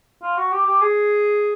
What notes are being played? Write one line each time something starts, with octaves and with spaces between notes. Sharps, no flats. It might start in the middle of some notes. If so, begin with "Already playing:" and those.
F4
F#4
G4
G4
G#4